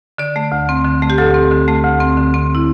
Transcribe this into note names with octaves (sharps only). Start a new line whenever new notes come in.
D3 D5
A3
D2
C4
D3
A3
G4
D2 A4
C4
D3
A3
D2
C4
D3
C4
E4